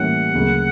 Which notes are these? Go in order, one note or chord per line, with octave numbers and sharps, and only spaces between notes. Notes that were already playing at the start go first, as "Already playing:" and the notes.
Already playing: A2 E3 G3 A#3 C#4 F#5
D2 C#3 F#3 A#3